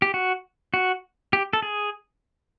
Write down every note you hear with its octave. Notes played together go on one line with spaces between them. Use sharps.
G4
F#4
F#4
G4
A4
G#4